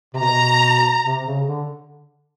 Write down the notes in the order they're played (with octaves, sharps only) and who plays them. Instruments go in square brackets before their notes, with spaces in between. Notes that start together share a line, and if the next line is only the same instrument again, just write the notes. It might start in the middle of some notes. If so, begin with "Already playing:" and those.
[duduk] C3
[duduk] B2 [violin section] A#5
[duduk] C3
C#3
D3